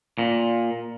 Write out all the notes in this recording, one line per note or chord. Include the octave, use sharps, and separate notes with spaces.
A#2